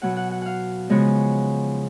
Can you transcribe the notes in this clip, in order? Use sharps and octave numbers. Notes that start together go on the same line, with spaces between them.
B2 F#3 B3 F#5
F#5
F#5
F5 F#5
C#3 F3 G#3 B3